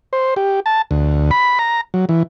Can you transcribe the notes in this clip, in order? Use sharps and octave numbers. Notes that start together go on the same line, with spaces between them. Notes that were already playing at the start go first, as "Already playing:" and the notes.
C5
G4
A5
D2
B5
A#5
F#3
E3